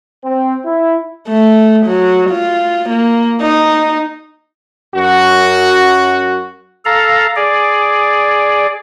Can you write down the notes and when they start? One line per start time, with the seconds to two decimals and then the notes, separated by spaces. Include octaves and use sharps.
0.24 C4
0.64 E4
1.28 A3
1.86 F#3
2.30 F4
2.89 A#3
3.41 D#4
4.95 F#2 F#4
6.85 A4 F5 A#5
7.36 G#4 D5